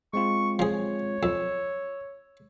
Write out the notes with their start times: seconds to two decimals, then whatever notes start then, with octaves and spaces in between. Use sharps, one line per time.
0.13 G#3 C4 F4 C#6
0.59 F3 G#4 C#5
1.23 F2 E6